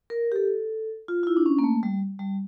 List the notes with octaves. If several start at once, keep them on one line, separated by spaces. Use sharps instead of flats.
A#4
G4
A4
F4
F4
E4
D4
C#4
A#3
A3
G3
G3